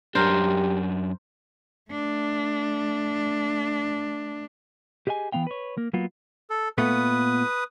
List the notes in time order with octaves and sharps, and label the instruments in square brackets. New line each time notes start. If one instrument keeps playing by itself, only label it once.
[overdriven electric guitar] F#2 D4 [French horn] G4 [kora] A#4 C5
[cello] A3 D4
[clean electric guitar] G4 G#4 D#5 F5 G#5
E3 A#3 B3 F5 G5
B4 C#5
A#3
F#3 A#3 B3 F4
[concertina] A4
[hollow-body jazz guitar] A#2 A3 B3 [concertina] B4 D#6